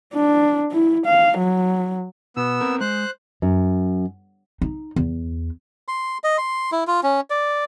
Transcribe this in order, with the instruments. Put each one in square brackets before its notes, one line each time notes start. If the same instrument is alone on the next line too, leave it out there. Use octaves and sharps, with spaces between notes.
[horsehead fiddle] D4
E4
F5
F#3
[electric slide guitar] B2 [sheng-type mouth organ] B3 E6
[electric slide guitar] C4 A#4
[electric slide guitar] G#3 [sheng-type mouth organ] C5 F#6
[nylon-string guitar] F#2
[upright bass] D#4
E2
[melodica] C6
D#5
C6
E4
F4
C#4
D5